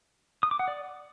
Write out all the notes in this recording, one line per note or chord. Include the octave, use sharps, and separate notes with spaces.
D#6
D6
F#5
D5